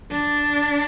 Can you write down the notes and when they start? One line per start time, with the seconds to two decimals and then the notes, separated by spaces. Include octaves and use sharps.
0.11 D4